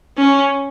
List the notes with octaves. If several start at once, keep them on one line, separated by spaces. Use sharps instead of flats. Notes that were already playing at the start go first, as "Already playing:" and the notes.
C#4